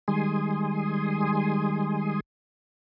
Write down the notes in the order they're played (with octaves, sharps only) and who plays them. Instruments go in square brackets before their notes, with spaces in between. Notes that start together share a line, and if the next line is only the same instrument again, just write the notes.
[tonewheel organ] D#3 G3 G#3 G#5 C6 D#6